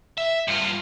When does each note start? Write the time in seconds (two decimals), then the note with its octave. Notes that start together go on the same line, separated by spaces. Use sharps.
0.18 E5
0.48 G2 F4